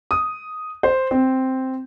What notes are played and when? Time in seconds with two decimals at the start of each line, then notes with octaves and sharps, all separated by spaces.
0.11 D#6
0.83 C5
1.11 C4